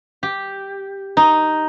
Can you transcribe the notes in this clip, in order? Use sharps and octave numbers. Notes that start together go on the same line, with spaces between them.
G4
D#4